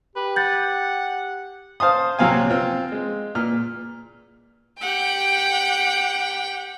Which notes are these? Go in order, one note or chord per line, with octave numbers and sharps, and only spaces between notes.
G4 B4
F#5 G6 A6
C5 F5 A5 C6 D#6
A#1 C3 F#3 C4 F5 G#5
C4 F4
G#3
A#2 F6
G4 F#5 G5